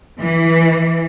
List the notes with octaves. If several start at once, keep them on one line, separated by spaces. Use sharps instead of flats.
E3